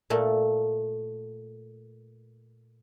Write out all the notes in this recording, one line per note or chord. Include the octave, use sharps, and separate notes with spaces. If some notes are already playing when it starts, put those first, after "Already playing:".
A#2 A3